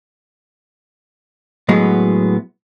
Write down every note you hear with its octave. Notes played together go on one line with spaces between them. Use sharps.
A2 F#3 G#3 B3